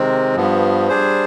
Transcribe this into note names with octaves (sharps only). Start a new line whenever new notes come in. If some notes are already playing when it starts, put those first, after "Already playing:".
Already playing: C3 D#3 G#3 C4
G2 F3 B3
G3 D4 G#4 C5